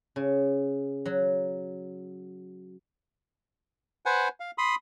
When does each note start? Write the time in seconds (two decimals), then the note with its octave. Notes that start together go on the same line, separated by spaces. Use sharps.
0.16 C#3
1.06 F#3
4.06 B4 C5 F#5 G#5
4.40 F5
4.58 B5 C6 D#6